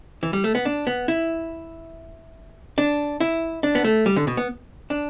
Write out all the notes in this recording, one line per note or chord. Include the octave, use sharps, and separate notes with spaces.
E3
G3
A3
B3
D4
B3
E4
D4
E4
D4
B3
A3
G3
D3
B2
B3
D4